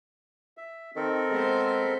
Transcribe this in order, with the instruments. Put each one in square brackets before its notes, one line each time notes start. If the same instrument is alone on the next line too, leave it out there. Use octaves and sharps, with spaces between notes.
[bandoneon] E5
[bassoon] D#3 [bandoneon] C4 A4 A#4
[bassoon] G#3 [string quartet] B3 C5